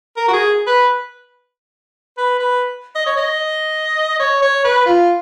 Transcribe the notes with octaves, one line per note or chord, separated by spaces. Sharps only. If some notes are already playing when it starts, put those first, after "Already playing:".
A#4
F#4
G#4
B4
B4
B4
D#5
C#5
D#5
C#5
C#5
B4
F4